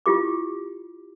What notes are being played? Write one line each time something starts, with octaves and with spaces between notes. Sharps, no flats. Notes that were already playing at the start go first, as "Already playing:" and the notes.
E4 F4 G4 D6